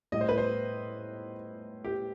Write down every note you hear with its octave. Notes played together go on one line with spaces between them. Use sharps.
A2 G3 D#5
C5
B4
C5
G4